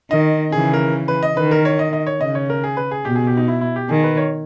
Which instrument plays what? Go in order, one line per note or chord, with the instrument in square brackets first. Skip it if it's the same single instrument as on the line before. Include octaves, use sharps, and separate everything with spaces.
[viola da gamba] D#3 [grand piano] D#5
[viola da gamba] C#3 E3 [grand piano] G#4
[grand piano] A#4
B4
D#5
[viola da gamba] D#3 [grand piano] B4
[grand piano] A#4
C#5
D#5
D#5
C#5
[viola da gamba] C#3 [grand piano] D#5
[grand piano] C#5
A#4
G#4
B4
G#4
[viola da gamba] B2 [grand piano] G4
[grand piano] G#4
G4
D#4
E4
E4
G4
[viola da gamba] D#3 [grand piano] G#4
[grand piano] B4
C#5